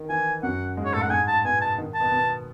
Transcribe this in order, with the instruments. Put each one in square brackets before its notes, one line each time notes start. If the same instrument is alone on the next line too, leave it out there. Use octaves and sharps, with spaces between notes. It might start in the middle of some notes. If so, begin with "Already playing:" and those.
Already playing: [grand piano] D#3
[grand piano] E3 [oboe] G#5
[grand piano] F#2 F#3 [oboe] F#5
[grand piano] G#2 G#3
[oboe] C#5
[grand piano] A2 A3 [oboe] A4
[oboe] F#5
[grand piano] G#2 G#3 [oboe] G#5
[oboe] A5
[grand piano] B2 B3 [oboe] G#5
[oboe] A5
[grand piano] D#3 D#4
[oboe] A5
[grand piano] B2 B3
B2 B3